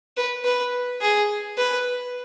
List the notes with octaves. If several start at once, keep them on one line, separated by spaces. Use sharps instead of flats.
B4
B4
G#4
B4